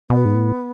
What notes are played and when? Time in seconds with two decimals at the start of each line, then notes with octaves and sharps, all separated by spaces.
0.10 B2 B3
0.25 G#2
0.34 A2